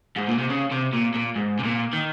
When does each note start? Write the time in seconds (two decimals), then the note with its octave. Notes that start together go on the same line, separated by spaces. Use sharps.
0.17 G#2
0.28 A#2
0.39 C3
0.50 C#3
0.72 C3
0.93 A#2
1.14 A#2
1.36 G#2
1.59 C3
1.64 A#2
1.93 D#3